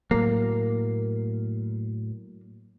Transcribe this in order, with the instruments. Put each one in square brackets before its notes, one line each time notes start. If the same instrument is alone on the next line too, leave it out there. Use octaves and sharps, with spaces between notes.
[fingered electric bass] A2 F#3 [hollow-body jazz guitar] A#3